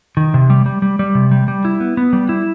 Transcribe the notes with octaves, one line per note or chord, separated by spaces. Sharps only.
D#3
C3
G3
G3
G3
G3
C3
G3
G3
E4
B3
B3
G3
E4